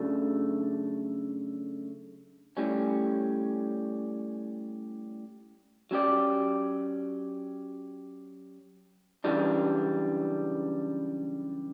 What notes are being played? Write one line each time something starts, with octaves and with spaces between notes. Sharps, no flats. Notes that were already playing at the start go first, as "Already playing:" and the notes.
Already playing: C#3 F#3 A3 D4
A2 G3 C#4
F#3 C#4 G4 D5
F#2 C#3 E3 G3 D4